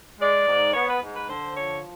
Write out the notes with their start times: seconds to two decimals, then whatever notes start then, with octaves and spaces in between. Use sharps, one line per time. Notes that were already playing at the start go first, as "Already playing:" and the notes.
0.20 G#3 D5
0.48 G#2
0.73 B3 C#5
0.88 B4
1.02 G#2
1.14 B4
1.28 D3 C5
1.55 F3 C#5